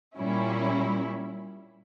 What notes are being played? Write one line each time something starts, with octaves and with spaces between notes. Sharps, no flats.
A#2 G3 C#4 E4